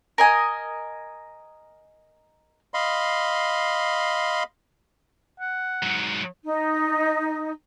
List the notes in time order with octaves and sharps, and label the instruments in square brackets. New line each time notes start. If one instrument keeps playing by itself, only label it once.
[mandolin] A#4 D#5 G#5
[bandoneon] D#5 F5 B5 C6
[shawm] F#5
[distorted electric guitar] G#2 F#3
[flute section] D#4